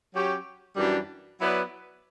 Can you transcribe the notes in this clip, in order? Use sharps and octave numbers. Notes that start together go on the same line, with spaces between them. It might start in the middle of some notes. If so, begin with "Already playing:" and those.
F#3 C#4 G4 C#5
F#2 E3 G3 D4
F#3 B3 E4 B4 D5